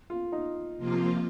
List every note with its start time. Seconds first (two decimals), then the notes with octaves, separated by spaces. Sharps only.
0.10 F4
0.32 D#4
0.77 C3 F3 A#3 F4